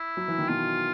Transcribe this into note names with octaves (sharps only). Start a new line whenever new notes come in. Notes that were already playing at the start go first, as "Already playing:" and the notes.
Already playing: E4
F#3
E3
D#3
B2 F4